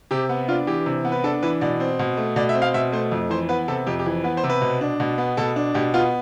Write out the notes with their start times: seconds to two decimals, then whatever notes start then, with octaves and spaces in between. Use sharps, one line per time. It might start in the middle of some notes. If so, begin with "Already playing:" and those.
0.11 C3 G4
0.29 B3
0.48 D4 F4
0.67 E3 G4
0.86 C3
1.05 B3
1.12 B4
1.23 D4 A4
1.43 E3 B4
1.61 B2 D5
1.80 C4
1.99 B2
2.17 A3
2.36 B2 D5
2.49 E5
2.55 C4
2.62 F5
2.74 B2 E5
2.92 A3 C5
3.11 F2
3.30 E3 C5
3.49 B3 B4
3.68 C3 A4
3.87 F2 G4
3.99 G4
4.06 E3
4.24 B3 B4
4.37 C5
4.44 C3
4.50 B4
4.62 B2
4.81 D4
5.00 B2
5.18 B3
5.37 B2 A4
5.56 D4
5.74 B2 G4
5.94 B3 F4